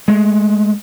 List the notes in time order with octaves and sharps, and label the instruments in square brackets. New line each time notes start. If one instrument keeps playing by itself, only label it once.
[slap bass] G#3 A3